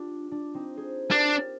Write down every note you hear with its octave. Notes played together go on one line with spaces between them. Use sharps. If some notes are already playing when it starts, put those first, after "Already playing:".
Already playing: D4 F4 G4
D4
C4 D#4
G#4 C5
D4 G4 A#4